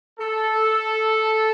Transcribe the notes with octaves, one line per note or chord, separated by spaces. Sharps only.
A4